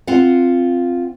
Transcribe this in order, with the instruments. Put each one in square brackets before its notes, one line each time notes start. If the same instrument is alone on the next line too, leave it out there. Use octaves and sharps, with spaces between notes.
[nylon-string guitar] C4 F4 F5 F#5